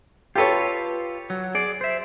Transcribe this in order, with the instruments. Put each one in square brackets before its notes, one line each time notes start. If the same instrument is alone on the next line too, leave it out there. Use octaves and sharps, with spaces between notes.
[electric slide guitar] F4 B4 [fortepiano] G4 A4 C#5
[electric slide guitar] F#3
G#4 D5
C5 E5